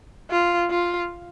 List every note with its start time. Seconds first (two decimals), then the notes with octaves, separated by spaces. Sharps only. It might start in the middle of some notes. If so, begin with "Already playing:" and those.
0.31 F4
0.70 F4